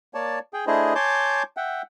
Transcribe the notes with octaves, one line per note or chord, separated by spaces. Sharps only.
A#3 C#5 D5 A5
G#4 G5
A3 D4 E4 G#4 C5 D#5
C#5 G#5 A5 C6 D6 G6
E5 F#5 G5